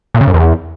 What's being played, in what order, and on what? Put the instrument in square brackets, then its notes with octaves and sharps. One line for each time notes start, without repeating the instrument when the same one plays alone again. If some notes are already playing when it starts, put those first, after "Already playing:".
[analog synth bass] A#2
C#3
F#2
E2